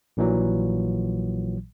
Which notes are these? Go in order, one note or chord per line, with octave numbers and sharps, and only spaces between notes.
A#1 A#2 E3 F#3